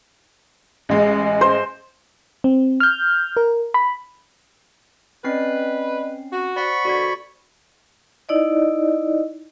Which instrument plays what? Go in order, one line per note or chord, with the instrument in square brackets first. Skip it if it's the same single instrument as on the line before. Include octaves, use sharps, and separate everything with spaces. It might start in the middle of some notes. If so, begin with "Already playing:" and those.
[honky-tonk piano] A1 G#3
[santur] C5
[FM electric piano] C4
F6 G6
A#4
B5
[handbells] C4 C#4 C7 [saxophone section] B4 [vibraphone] D5 D#5 B5
[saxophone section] F#4
[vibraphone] C5 [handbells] D5 F#5 [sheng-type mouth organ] B5 C#6
[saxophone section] B2 D3 [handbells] F#4 D5 G#6
[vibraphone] D#4 E4 D5 D#5